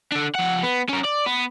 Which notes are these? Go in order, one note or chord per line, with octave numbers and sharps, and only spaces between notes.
D3 D4
F3 F#5
B3
C#4 A#4
D5
B3